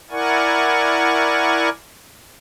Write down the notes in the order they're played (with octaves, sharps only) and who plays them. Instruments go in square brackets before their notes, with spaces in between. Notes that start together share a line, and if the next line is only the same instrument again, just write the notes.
[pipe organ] E4 A#4 D5 F#5 G#5 C#6